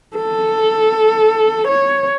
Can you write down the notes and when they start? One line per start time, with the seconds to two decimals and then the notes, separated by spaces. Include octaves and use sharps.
0.16 A4
1.67 C#5